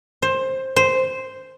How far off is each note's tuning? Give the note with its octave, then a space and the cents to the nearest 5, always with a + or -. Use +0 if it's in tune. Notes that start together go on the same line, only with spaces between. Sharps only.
C5 +15
C5 -5